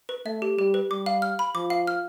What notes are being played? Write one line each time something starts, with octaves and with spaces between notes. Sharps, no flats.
B4
A3 E5
G4
G3 G4
B4
G3 D6
F5
F6
B5
F3 D6
F5
F6